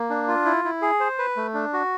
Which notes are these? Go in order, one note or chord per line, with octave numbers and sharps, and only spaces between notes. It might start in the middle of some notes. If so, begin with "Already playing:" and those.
Already playing: A#3
D4
F4
E4
E4
G#4
C5
B4
A3
D4
F#4